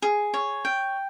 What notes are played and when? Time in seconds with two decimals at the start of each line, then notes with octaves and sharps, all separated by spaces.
0.02 G#4
0.34 C#5
0.65 G5